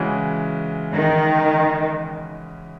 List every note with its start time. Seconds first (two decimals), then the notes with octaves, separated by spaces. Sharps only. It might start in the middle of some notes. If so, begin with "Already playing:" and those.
Already playing: C#3 E3 G#3 C#4 F#4
0.93 D#3